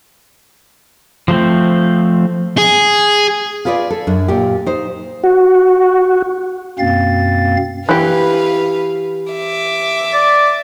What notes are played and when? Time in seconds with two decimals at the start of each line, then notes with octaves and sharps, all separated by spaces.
1.28 F3 A3 C4
2.58 G#4
3.65 F4 G#4 B4 C#5 D5
3.90 A4
4.07 F#2 D4
4.28 A#2 G4
4.66 D#4 C5
5.23 F#4
6.79 F#2 B2 A#3 C4 F5 A6
7.89 E3 G4 B4 F5
9.33 E5 D6
10.14 D5